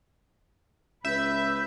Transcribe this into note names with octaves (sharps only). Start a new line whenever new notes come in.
C#2 B4 E5 G6